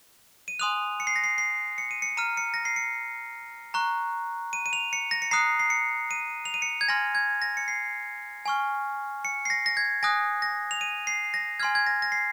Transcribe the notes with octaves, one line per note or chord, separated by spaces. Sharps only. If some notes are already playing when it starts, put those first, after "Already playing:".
D#7
G#5 C6 D#6 F#6 F7
C#7
C7
A#6
C7
C7
C#7
D#7
C#7
A#5 F6 D#7
C#7
A#6
C7
C#7
A#5 C#6 F#6
D#7
D#7
F7
C#7
A#6
C#7
A#5 D#6 F#6 C7
C7
C#7
D#7
F7
D#7
C#7
G#6
G#5 C6 F6 A#6
G#6
A#6
C#7
C7
G#5 C#6 F6
C#7
C7
A#6
A#6
G#6
G#5 D#6 F#6 A#6
A#6
F7
D#7
C7
A#6
G#5 C6 F6 G#6
G#6
A#6
A#6
C7